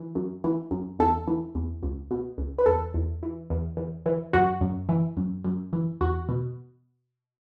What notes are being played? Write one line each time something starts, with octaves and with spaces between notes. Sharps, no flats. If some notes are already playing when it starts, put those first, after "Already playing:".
Already playing: E3
F#2
E3
F#2
E2 A4
E3
E2
C#2
B2
C#2
B4
E2 A4
E2
E3
E2
E2
E3
F#2 F#4
F#2
E3
F#2
F#2
E3
E2 F#4
B2